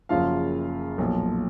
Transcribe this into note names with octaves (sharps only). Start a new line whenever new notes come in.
F#1 F#2 C#3 F3 F4 F5
B1 A#2 F3